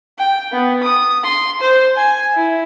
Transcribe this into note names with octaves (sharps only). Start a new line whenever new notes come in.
G5
B3
D#6
C6
C5
G#5
E4